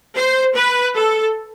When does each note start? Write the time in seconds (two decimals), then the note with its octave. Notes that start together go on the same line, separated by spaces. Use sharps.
0.16 C5
0.55 B4
0.95 A4